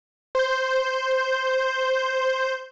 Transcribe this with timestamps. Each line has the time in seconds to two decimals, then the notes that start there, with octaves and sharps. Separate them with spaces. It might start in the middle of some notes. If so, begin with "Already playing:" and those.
0.35 C5 G6